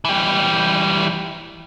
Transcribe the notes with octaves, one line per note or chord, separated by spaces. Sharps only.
E3 G3